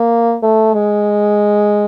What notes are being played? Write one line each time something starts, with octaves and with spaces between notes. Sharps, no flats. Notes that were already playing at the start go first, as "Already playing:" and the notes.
Already playing: A#3
A3
G#3